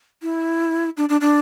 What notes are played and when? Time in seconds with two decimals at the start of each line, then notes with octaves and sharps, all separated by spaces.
0.22 E4
0.97 D4
1.09 D4
1.21 D4